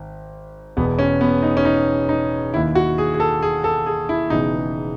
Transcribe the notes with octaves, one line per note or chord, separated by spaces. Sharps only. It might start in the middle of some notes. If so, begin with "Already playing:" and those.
Already playing: G#1
E1 E2 B2 B3
C#4
B3
D#4
C#4
D#4
D#4
D#2 D#3 E4
F#4
G#4
G#4
A4
G#4
A4
G#4
E4
E1 E2 C#3 E3 D#4